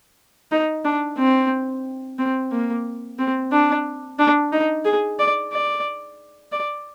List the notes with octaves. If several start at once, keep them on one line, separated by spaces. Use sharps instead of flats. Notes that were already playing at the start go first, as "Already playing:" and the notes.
D#4
D4
C4
C4
A#3
C4
D4
D4
D#4
G#4
D5
D5
D5